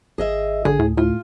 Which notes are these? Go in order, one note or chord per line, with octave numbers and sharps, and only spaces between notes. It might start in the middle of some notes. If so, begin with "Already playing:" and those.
G#1 G#4 D#5 E5
A1 D3 G#4
D2 A2
A2 F4